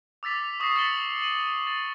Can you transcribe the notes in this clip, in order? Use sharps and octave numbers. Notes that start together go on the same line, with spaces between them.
D6 E6 A6 B6 F7
C#6 D#6 E6 A#6 C7
E6 A6 B6 C#7 F#7 G7
D#7 F#7
A6